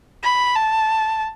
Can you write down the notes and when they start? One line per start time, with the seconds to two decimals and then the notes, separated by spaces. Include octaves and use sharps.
0.23 B5
0.55 A5